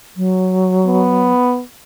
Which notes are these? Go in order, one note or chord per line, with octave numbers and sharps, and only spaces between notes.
F#3
B3